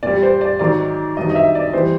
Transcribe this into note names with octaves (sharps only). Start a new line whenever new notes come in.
A#2 G3 D5
C5
D5
G#2 D#3 F#3 D5
G2 D#3 F#3 D#5
D#5
E5
D5
E3 G3 C5